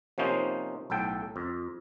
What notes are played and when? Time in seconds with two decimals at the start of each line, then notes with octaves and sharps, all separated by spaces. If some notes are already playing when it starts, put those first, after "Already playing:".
0.18 C3 F3 A#3 C#4 D#4 C5
0.90 B1 A2 A4 G5
1.36 F2